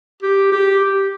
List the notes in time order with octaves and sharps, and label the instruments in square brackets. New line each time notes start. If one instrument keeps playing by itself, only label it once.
[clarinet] G4
G4